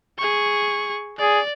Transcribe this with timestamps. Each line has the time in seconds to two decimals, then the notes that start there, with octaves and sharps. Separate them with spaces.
0.18 G#4 C#6
1.19 G#4 D5